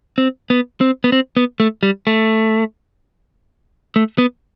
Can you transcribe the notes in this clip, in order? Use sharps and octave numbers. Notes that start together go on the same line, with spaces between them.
C4
B3
C4
B3
C4
B3
A3
G3
A3
A3
B3